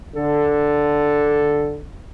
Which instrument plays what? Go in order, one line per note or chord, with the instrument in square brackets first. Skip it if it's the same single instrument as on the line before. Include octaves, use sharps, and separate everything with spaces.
[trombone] D3 [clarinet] A4